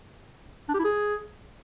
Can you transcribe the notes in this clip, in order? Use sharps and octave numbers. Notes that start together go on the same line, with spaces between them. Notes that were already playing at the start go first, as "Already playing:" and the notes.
D4
G4
E4
G#4